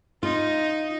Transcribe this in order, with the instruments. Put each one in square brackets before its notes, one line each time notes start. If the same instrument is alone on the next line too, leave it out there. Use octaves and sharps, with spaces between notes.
[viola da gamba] D#4 [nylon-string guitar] F4